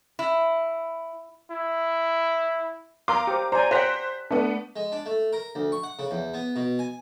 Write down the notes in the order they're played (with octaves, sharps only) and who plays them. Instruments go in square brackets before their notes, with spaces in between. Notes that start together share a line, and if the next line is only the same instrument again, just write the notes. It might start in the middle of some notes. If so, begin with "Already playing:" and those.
[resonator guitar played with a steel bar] E4
[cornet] E4
[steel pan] A#4 F5 C6 [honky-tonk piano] A#5 D6
[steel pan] G4 C5
[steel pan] C5 D5 G#5 [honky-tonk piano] A#5
[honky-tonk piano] C5 F#6 B6 [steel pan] F#5 G5 A#5
[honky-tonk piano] A3 B3 [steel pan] D4
[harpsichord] G#3
D4
A3
A#4
D2
C#6
F#5
C#3
E2
B3
B2
G#5